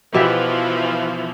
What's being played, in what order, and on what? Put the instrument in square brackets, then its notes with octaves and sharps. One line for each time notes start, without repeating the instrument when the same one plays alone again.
[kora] B2 G4 E5 [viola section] E3 F3